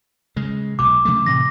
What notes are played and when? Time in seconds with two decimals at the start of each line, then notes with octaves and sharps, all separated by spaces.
0.36 C#3 G#3
0.79 B1 B2 D6
1.05 C#3 F3 A3
1.26 A2 C3 E3 A#6